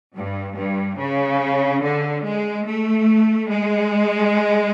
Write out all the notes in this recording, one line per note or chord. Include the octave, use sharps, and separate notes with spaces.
G2
G2
C#3
D3
G#3
A3
G#3